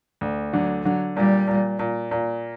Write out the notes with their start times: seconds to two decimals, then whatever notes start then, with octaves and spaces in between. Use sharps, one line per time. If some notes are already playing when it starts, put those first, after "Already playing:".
0.21 D2
0.53 D3 F#3
0.85 D3 F#3
1.16 A#2 G3
1.48 A#2
1.79 A#2
2.11 A#2